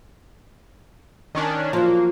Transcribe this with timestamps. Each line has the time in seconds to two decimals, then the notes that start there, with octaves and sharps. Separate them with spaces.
1.35 D#3 C#4 D4
1.73 F3 F#3 A#3